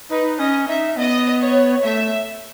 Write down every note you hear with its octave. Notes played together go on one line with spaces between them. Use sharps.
D#4 B4
C#4 D#5
D#4 E5
B3 D#5
C#5
A3 E5